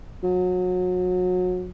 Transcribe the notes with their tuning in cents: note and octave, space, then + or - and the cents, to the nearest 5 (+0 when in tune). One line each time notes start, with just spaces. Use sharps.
F#3 -30